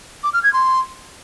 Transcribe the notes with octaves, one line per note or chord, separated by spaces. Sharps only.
D6
F6
G#6
C6